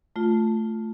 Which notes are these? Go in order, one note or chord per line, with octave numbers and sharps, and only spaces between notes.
A3 F4